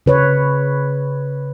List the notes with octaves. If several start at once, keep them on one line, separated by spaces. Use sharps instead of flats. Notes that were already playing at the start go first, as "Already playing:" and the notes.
C#3 B4 C#5